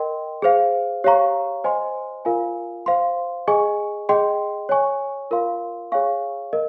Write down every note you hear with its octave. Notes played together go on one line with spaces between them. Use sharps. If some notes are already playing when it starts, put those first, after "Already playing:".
Already playing: A#4 D#5 G5 C6
G#4 C5 F5
G4 C#5 F5 A#5 C#6
C5 D#5 G#5 C6
F4 A#4 F5 G#5
C5 F5 C6
G#4 D#5 G#5 C#6
G#4 D#5 G5 C6
C#5 G#5 C#6
F4 A#4 F5 C6
G#4 C#5 F5 G#5 C#6
A#4 D#5